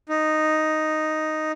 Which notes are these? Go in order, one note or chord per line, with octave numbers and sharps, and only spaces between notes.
D#4